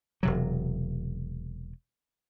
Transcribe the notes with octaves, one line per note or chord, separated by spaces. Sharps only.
E1 C3 F#3